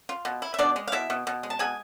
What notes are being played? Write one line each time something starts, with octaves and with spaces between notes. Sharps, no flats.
F4
B2
E4
E5
B2 D4 D5
G#3
F5
B2 E4 E5
B2
B2
G#3
A5
B2 G#4 G#5